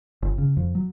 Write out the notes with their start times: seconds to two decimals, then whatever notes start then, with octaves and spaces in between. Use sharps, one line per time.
0.22 G1
0.38 C#3
0.57 F2
0.75 F#3